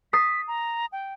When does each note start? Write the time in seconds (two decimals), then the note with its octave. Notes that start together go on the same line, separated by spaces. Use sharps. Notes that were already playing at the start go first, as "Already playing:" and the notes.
0.13 D#6 A6 B6 C7
0.48 A#5
0.92 G5